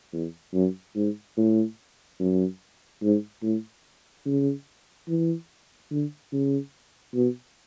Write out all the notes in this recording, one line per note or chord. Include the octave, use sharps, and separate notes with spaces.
E2
F#2
G#2
A2
F#2
G#2
A2
C#3
E3
D3
C#3
B2